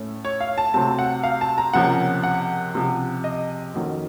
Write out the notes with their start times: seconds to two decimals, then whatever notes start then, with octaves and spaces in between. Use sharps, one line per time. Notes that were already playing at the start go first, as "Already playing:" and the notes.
Already playing: A2 A3 C#4
0.25 C#5
0.40 F5
0.58 A5
0.74 C3 F#3 A3 C4 A5
0.99 F#5
1.23 F5
1.41 A5
1.58 A#5
1.73 C#2 C3 F3 A#3 C#4 F#5
2.24 F#5
2.74 C#2 C3 F3
3.24 D#5
3.74 F2 D#3 F#3 A#3 C#4